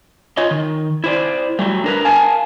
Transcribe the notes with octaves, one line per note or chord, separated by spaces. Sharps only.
F4 C#5 D#5
D#3
E4 C5 D5
F#3 G3 A3
D4 A#4 B4
A#4 F5 G#5 A5